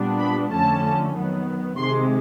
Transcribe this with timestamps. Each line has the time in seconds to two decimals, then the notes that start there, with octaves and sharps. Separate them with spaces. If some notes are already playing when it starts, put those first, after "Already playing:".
Already playing: A#2 G3 B3 D4
0.18 B5
0.50 F2 D3 F3 A3 C#4 A5
1.14 D#3 F#3 B3
1.76 C3 D#3 G#3 C6